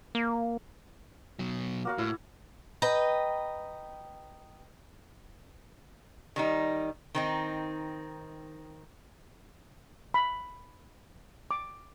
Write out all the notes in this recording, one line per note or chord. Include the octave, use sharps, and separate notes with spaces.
A#3
B2 F#3
A#3 F#4 F5
A2 E4
B4 D#5 G5 A#5
D#3 G3 D#4
D#3 C4 D#4
B5
D6